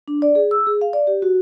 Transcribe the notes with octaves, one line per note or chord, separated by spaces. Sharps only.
D4
D5
G#4
E6
G#4
F5
D5
G4
F#4